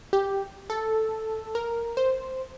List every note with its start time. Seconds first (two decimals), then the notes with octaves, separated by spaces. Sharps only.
0.13 G4
0.70 A4
1.55 A#4
1.97 C5